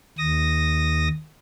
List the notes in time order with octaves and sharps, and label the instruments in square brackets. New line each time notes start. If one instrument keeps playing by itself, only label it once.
[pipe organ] D#2 D#6 A#6